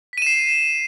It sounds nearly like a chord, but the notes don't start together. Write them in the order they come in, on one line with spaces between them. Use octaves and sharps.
B6 D#7 E7 C7